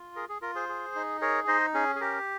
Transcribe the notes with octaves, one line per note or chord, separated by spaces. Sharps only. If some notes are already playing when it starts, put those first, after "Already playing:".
Already playing: F4
G#4 A#4
G#4
F4 A#4
G#4 C5
G#4
D#4
G#4 A#4 C#5
D#4 C5 D#5
C#4 G#4
G#4
G4 A#4